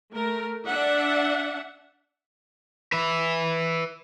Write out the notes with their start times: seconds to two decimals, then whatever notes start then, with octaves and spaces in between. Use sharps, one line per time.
0.13 A3 A#4
0.66 D4 E5 F#5
2.92 B4 E5